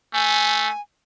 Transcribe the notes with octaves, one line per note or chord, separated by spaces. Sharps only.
A3 G#5